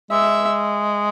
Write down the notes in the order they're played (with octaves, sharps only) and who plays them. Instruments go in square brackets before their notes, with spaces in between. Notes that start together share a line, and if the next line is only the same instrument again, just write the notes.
[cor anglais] G#3 [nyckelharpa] E5